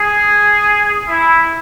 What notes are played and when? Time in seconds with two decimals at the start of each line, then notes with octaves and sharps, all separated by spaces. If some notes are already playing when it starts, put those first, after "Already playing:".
Already playing: G#4
1.07 E4